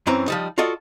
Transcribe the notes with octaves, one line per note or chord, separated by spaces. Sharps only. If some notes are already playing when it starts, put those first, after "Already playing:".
F#2 E3 C4 C#4 A#5
F3 G3 D#4
F4 F#4 A4 D5 D#5